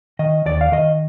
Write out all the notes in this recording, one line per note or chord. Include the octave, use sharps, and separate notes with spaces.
D#3 D#5
D#2 D5
F5
D#3 D#5